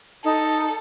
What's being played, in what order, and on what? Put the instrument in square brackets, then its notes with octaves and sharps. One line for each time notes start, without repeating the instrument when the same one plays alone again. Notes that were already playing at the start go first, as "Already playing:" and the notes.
[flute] D#4 [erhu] A4